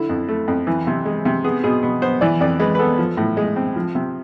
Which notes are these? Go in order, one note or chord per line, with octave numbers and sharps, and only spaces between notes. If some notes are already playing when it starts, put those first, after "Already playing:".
Already playing: D3 E4
F2
A3
F2
E3
C3
G#3
C3
B3 G#4
B2 G#4
B2
B3 C5
E3 D5
F2 D5
G#3 B4
B4
B3 A4
F3
A2
G#3
C4
F3
C3